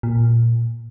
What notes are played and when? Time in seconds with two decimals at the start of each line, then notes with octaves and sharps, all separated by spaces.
0.03 A#2